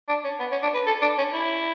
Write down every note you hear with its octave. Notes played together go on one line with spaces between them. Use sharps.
D4
C#4
B3
C#4
D4
B4
A4
D4
C#4
E4